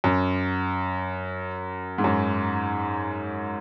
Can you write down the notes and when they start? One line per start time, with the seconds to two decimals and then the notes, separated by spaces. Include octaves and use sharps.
0.04 F#2
1.98 G#2
2.04 F#2